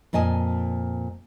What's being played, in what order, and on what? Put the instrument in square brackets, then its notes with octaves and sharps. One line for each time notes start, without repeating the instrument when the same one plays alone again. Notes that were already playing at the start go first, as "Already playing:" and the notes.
[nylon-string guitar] F2 A#2 D#5 G#5 A5